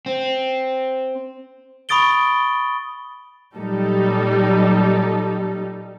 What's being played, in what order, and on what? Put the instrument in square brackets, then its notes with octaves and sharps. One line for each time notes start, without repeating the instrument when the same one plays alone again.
[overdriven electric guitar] C4
[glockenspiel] B5 C#6 D#6 A6 D7 G7
[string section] A#2 F#3 G3 D#4 A4